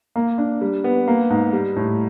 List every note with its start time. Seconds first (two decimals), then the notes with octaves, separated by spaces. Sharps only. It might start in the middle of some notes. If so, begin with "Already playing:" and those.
0.16 A#3
0.38 D4
0.61 G3
0.84 B3
1.08 A#3
1.30 G#2
1.53 G3
1.76 A2